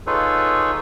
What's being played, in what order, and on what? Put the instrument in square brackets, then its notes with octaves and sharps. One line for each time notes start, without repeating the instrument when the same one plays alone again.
[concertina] D#4 F4 G#4 A4 B4 C#5